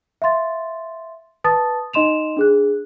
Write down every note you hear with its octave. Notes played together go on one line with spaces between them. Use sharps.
E5 F5 C6 A6
B4 A5 D#6 A6
D#4 D#5 C6 E7 F7
D4 G#4 F#6